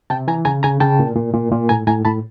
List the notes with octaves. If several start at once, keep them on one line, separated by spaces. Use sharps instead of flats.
C3 G5 A5
E3 G#5 A#5
C#3 G#5 A#5
C#3 G#5 A#5
C#3 G5 A5
A#2
A#2
A#2
A#2
A2 G#5 A#5
A2 G#5 A#5
A2 A5 B5